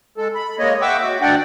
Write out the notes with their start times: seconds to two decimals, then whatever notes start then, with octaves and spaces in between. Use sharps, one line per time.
0.17 G#3 A4
0.35 B5
0.59 G#3 A#3 C#5 D#5
0.82 E5 F#5 G5 C#6 D6 E6
0.99 F#4
1.21 D2 D4 D5 F#5 G5